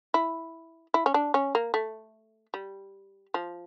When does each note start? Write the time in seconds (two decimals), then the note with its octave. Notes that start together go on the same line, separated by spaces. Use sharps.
0.14 E4
0.94 E4
1.06 C#4
1.14 D4
1.34 C#4
1.55 A#3
1.74 A3
2.54 G3
3.34 F3